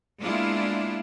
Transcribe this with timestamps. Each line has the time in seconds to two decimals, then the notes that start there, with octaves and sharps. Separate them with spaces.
0.20 G#3 A#3 B3 D4 E4 F4